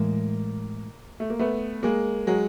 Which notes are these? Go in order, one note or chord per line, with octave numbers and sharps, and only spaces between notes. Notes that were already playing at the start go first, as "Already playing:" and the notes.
Already playing: A2 E3 G#3 A#3
A3
A#3
A3 B3
G#3 A#3
F#3 G#3